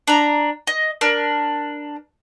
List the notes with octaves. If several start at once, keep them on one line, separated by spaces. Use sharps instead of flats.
D4 A#5
D#5
D4 A#4 F6